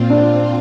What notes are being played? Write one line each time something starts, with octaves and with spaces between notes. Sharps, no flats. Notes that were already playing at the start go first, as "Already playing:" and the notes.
Already playing: A#2 C4 F4
D4